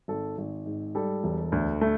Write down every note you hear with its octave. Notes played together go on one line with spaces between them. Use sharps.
G#1 A4
G#1
G#2
G3 A4
E1
D2
A3